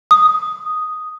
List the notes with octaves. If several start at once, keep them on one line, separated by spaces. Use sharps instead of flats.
D#6